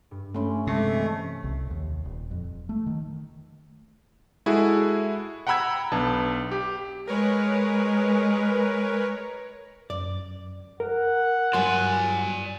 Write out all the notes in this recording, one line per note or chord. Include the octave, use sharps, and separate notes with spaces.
G2
A3 C#4 G5 B5 C6
C3 G#3 A3
E3 C#4
C2
D#2
D#1
F2
A3
D#3
G#3 E4 F#4 G#4 A4
F#5 G5 A#5 B5 E6 G#6
B1 B3 D4 A5
G4
G#3 A#4 B4 C#5
F#2 D5
A#4 F#5
G2 F#3 D5 G#5 C6